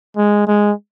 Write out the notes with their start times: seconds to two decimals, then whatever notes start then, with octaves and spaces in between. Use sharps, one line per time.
0.17 G#3
0.47 G#3